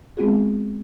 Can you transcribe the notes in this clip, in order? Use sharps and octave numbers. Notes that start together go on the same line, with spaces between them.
G#3 B3 C4 F4 F#4 G#4